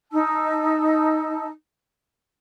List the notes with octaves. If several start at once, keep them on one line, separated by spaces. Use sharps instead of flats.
D#4 A5 E6